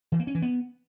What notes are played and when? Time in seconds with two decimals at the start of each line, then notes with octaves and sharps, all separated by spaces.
0.12 E3
0.20 A#3
0.27 C#4
0.35 E3
0.42 B3